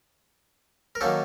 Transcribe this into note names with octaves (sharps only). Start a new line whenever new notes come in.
A#4
D#3 F#3 A#3 C#4 G4 A4